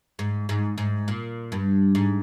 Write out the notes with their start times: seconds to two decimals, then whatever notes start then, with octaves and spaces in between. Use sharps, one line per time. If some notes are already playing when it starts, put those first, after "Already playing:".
0.19 G#2
0.49 G#2
0.78 G#2
1.08 A#2
1.52 G2
1.95 G#2